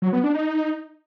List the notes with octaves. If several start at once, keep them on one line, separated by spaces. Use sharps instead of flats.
F#3
B3
D4
D#4